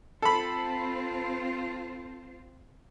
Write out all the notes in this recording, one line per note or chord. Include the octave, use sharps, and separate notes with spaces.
C4 F4 A4 C5 B5